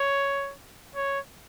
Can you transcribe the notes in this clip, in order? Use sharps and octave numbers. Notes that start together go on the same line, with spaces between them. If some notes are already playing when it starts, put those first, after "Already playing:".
Already playing: C#5
C#5